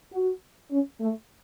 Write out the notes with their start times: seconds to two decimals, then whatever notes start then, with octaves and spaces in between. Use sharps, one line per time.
0.11 F#4
0.71 C#4
1.00 A3